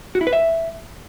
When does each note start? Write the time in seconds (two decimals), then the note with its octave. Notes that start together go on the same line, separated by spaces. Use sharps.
0.15 F#4
0.21 E4
0.27 B4
0.33 E5